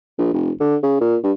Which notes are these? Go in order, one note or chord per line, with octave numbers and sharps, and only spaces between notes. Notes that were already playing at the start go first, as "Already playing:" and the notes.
A#1
F1
D3
C#3
A#2
G2